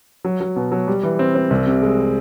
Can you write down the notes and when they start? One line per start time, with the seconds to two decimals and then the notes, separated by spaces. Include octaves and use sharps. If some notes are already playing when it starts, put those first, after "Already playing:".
0.25 F#3
0.41 F#3
0.56 B2
0.72 F#3
0.88 G3
1.03 E3
1.19 C4
1.35 C4
1.50 C2
1.67 C3
1.82 G#3